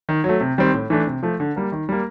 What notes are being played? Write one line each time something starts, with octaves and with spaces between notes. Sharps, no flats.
D#3
F#3 A3
C3
D#3 G3 C4
A2
E3 A3 D4
C3
F3 A3
D3
G3 A#3
D#3
G3 A#3